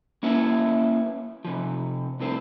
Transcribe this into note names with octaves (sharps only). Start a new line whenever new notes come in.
A#3 C#4 E4 B4 E5
C3 F3
C2 A2 C4 C5